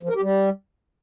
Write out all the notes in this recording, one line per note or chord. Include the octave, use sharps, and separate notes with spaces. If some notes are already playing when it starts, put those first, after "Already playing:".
F3
A#4
G4
G3